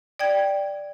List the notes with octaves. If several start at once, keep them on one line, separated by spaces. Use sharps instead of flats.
D5 G5 G#6